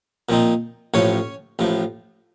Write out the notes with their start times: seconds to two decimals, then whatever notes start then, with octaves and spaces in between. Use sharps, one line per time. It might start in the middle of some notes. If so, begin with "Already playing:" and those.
0.29 A#2 F3 C4 D#4
0.94 A1 A2 F3 C#4 C#5
1.59 A1 A2 F3